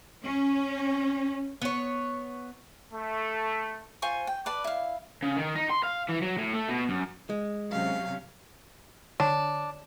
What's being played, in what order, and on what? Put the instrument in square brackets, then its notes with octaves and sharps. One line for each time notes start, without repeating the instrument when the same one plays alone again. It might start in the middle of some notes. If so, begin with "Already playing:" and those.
[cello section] C#4
[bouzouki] B3 C#5
[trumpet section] A3
[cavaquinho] F4 C5 G#5 C#6
G5
B4 D5 A5
E4 F5
[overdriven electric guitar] C#3
D#3
D#4
C6
F5
E3
F#3
A2
A3
B2
F#2
[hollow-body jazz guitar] G#3
[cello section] C3 F#3 C#4 [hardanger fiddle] F5
[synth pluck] D3 C#5 E7 [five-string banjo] D4